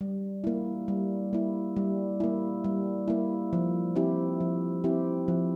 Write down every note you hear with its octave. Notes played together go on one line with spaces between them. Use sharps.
G3
A#3 E4
G3
A#3 E4
G3
A#3 E4
G3
A#3 E4
F3
C4 E4 G4
F3
C4 E4 G4
F3